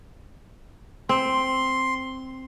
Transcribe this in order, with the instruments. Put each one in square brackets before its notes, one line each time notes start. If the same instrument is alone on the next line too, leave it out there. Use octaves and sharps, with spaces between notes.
[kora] C4 [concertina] C6